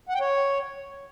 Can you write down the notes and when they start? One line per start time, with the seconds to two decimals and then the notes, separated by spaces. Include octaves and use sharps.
0.09 F#5
0.15 G5
0.21 C#5